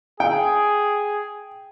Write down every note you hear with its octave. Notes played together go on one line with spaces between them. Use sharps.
G#4 G5